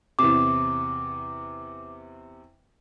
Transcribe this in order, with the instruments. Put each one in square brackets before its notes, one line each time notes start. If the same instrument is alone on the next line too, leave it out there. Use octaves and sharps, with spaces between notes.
[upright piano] E2 C3 [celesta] D6